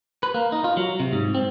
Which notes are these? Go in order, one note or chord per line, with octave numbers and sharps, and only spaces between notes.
B4
A#3
D#4
F4
F#3
C3
G#2
C4